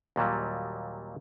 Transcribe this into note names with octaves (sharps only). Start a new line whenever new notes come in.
D#2 A#2 F#3 G3